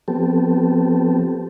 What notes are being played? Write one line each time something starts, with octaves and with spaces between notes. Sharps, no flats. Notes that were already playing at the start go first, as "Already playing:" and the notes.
F3 B3 C4 G4 A4